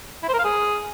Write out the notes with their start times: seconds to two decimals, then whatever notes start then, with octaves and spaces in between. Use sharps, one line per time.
0.23 E4
0.28 C5
0.34 A#4
0.39 F5
0.45 G#4